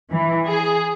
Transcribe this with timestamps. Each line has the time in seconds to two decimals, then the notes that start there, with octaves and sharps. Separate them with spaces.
0.10 E3
0.47 G#4